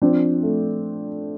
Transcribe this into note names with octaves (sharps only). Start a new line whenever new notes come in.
F3 C4 D4
A3